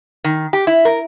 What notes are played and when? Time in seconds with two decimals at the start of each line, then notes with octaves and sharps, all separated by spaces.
0.24 D#3
0.53 G4
0.67 E4
0.85 A#4